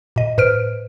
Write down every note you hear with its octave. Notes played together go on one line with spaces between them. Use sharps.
A#2 D#5
A2 B4 C5 F6 D7